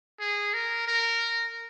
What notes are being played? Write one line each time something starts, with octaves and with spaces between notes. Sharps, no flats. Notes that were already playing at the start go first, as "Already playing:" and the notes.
G#4
A#4
A#4